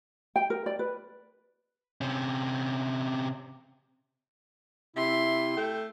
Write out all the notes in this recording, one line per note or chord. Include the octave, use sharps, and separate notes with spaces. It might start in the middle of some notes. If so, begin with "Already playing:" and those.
G5
A#4
D5
B4
C3 C#4
C3 E4 E5 C6
A3 G5